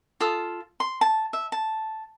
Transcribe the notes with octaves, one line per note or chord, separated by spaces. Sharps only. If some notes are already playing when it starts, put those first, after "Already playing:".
F4 A4 D#6
C6
A5
E5
A5